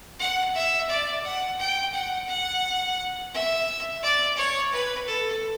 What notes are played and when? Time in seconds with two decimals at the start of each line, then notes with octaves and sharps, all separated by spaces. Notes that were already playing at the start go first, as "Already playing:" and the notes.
0.19 F#5
0.55 E5
0.89 D5
1.24 F#5
1.59 G5
1.93 F#5
2.28 F#5
3.32 E5
4.02 D5
4.36 C#5
4.72 B4
5.07 A4